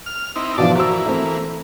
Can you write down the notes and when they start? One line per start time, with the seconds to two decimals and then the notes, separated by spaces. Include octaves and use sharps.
0.06 F6
0.36 C4 D#4 E4
0.58 B2 E3 F3 D4 D5 A5
0.75 E3 A#3 F#4 C5 E6
1.06 A3 C4